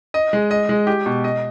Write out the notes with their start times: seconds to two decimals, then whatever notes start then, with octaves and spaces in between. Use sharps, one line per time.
0.14 D#5
0.33 G#3
0.51 D#5
0.69 G#3
0.87 G4
1.06 B2
1.24 D#5